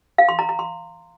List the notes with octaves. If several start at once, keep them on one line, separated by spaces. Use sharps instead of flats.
F5
C6
A#5
A#5
C6